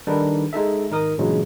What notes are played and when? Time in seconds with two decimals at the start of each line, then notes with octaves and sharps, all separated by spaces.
0.07 D#3 G3 D4 D#4 A4 B4
0.53 G#3 D#4 A4 E5
0.91 G#1 D#4 A#4 D#6
1.18 G2 A#2 C#3 E3 F#3 G#3